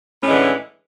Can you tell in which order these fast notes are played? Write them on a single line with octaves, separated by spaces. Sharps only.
A2 C#4 G#3 E3 D3